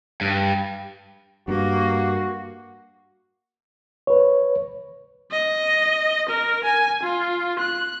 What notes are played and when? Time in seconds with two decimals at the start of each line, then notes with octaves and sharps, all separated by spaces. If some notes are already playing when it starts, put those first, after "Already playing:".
0.21 G2
1.48 G2 A#3 F#4
4.07 B4 C#5
5.31 D#5
6.29 A#4
6.64 G#5
7.03 F4
7.59 F#6